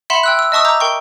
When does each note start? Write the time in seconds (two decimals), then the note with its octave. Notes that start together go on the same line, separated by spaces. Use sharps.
0.10 E5 F#5 B5 C6 E7 F#7
0.23 G5 E6 F#6
0.39 E6
0.52 D#5 E5 A5 C#6 D#6 E6
0.65 A#5 D6 E6 G6
0.80 A#4 G5 C#6